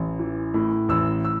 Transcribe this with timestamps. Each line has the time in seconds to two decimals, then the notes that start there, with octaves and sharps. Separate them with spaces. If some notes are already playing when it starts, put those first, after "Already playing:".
Already playing: A1
0.19 E3
0.54 A2
0.89 A1 E6
1.25 E6